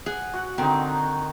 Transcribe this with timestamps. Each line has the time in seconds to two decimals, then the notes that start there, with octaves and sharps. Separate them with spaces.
0.06 G#4 F#5
0.34 F#4
0.58 D3 D#3 C4 D#4